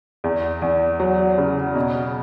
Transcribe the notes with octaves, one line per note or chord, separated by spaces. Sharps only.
E2
E2
F#3
C#3
B2